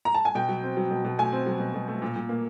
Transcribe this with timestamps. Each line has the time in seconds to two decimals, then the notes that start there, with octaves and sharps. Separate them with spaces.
0.05 A#5
0.14 A5
0.25 G#5
0.35 B2 G5
0.49 F#3
0.63 C4
0.77 F#3
0.91 B2
1.05 B2
1.18 A3 G#5
1.33 C4
1.46 F#3
1.60 B2
1.74 B2
1.88 A3
2.02 A#2
2.16 A#2
2.29 A#3